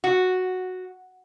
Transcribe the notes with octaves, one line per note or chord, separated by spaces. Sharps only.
F#4